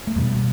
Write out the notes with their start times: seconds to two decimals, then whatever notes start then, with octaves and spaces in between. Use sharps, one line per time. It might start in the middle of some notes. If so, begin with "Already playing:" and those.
0.07 A3
0.16 E2 B2 G3